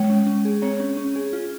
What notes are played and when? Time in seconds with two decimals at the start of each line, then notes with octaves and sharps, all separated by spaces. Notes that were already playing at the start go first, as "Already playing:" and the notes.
Already playing: G#3 C#5
0.10 C#4
0.27 C#4
0.45 G#4
0.62 C4 C#5
0.80 C#4
0.97 C#4
1.16 G#4
1.33 F4